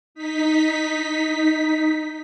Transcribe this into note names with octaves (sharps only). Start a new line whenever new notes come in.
D#4 B6